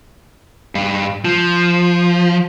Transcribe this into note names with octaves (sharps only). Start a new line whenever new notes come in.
G2 F5
F3